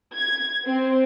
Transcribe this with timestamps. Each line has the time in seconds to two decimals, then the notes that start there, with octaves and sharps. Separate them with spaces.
0.15 G#6
0.66 C4